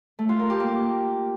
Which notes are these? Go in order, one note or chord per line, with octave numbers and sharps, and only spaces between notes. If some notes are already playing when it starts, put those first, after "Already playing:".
A3
F4
A#4
G4
A#3